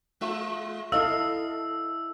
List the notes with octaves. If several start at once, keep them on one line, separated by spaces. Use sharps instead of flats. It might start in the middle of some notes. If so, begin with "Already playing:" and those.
G#3 F4 E5
E4 A4 D#5 F5 E6